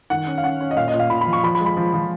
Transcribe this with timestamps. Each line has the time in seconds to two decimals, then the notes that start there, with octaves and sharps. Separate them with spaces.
0.10 D#3 F#5
0.27 C#4
0.38 F5
0.43 C#4 F#5
0.61 C#4
0.71 D#5
0.77 A#2 F5
0.88 D#5
0.94 A#2
0.99 F5
1.10 A#2 B5
1.21 B5
1.27 F3
1.33 C#6
1.43 F3 B5
1.55 B5
1.60 G#3
1.66 B5
1.77 F3
1.94 F3